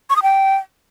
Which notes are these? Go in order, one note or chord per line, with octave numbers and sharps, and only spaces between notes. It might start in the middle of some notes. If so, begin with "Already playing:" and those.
C#6
D#6
G5